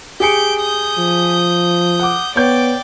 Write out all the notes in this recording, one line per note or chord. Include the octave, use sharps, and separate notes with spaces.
G4 G#4 G6 C#7 D7
D#6 G6
F3
F#5 D6
B3 C#5 D5 G5 G6